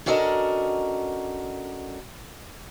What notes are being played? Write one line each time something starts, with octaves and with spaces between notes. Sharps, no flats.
C#4 D4 F#4 A4 A#4 D#5